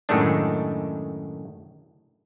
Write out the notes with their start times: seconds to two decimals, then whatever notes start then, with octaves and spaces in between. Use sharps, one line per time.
0.09 F#2 A2 D#3 G#3 A3 D4